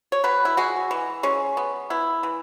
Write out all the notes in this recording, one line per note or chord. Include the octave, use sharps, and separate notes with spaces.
C#5
B2 B4
E4
G#3 F#4
E3
G#3 C#4
B3
B3 E4
E3